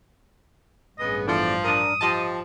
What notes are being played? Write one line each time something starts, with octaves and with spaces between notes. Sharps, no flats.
A1 G2 C#3 G#3 B3 D#5
E2 D3 E3 F3 D5
D4 A#4 D#6
F3 G4 D#5 A5